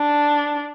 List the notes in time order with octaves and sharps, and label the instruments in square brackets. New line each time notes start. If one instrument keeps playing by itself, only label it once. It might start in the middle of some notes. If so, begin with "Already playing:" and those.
Already playing: [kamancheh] D4